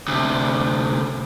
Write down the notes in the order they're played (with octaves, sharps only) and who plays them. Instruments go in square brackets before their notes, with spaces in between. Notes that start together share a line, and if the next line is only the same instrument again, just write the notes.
[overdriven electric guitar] D2 C3